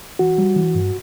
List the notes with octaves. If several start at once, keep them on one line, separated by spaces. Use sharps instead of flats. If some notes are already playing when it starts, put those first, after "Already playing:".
E3 F#4
G3
E3
G2